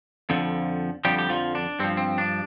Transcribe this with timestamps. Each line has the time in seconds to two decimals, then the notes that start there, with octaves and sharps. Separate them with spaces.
0.30 F2 D3 F3
1.05 F2 D3 F3 G3 G4
1.18 G4
1.30 F3 F4
1.55 D4
1.79 G2 C4
1.84 F3
1.97 C4
2.18 D4